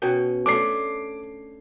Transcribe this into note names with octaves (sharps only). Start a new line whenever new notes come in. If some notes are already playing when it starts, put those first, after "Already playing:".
B2 C#4 G5
A3 C#4 D4 D6 C7